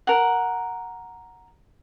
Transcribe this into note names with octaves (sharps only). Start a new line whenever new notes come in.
A#4 F#5